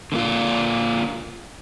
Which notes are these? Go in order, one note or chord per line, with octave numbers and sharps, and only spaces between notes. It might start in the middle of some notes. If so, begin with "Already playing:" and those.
D3 A#3 F4